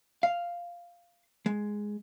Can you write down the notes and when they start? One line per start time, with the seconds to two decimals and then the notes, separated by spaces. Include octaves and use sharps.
0.23 F5
1.46 G#3